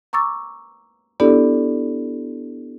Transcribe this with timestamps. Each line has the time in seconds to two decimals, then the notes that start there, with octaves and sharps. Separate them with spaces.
0.13 A#5 C#6 D6 E6 A6
1.20 B3 D4 E4 G4 A4 D5